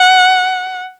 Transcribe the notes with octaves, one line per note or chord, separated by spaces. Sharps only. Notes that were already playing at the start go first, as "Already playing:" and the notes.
Already playing: F#5